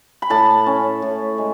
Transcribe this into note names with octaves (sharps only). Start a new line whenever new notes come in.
B5
A2 A5
C#4
A2
G#3